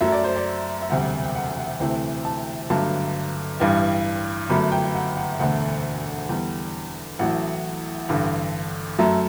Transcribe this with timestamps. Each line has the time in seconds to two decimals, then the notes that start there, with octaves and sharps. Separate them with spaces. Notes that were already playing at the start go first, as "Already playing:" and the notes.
0.01 F#2 F#3 A3 E5
0.12 D5
0.24 C5
0.36 D5
0.82 E5
0.90 E1 D2 C3 G3 F#5
1.24 G5
1.35 F#5
1.58 F#5
1.80 D2 C3 E3 A3 G5
2.25 A5
2.70 G1 G2 D3 F#3 A3 A5
3.60 A1 G2 E3 G3
4.50 G1 F#2 F#3 A3 B5
4.72 G5
4.94 F#5
5.17 F#5
5.39 E1 D2 D3 A3 F#5
6.29 E2 D3 G3
7.19 A1 A2 F#3 A3 F#5
8.09 A1 G2 D3
8.99 F#2 F#3 A3 E5